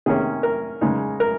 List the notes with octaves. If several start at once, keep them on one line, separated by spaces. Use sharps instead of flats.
C3 D#3 A#3 C#4 G#4
A#4
C#3 G#3 D#4
A#4